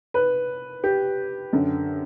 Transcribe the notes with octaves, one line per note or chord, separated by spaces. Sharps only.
B4
G4
F#2 D3